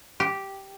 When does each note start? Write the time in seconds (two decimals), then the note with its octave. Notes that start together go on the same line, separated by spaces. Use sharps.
0.20 G4